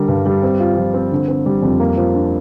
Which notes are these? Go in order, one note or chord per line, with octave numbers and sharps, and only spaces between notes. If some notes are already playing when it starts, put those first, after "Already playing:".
Already playing: D3 G3 A#4
G2
G3
C4
F4
F3
C4
D3
C4
G3
F2
A#3
F3
D4